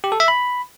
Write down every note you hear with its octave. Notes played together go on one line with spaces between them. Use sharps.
G4
A4
E5
B5